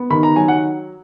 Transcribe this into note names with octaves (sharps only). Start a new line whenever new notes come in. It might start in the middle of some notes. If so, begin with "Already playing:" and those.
Already playing: B3
D#3 B5
A#5
F#3 G#5
F#5